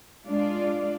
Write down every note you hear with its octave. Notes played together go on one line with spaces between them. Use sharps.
G#3 D4 F4 D5